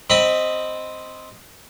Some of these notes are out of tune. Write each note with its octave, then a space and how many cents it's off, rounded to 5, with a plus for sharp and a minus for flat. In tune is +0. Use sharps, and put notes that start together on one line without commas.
C4 +0 D#5 +0 B5 +0